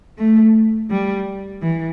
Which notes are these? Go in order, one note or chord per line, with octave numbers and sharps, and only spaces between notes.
A3
G3
E3